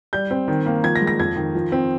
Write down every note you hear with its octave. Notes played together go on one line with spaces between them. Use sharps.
G3 G6
C4
D#3
A#3
F3 G#6
A#6
G#3
A#6
F2 G#6
D#3
F3
C4